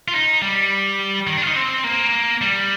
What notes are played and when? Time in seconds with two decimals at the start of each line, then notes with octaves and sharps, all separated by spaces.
0.08 F4
0.14 D#4
0.42 G3
1.27 D#3
1.37 D4
1.42 F4
1.47 D#4
1.56 C4
1.84 A#3
2.41 G3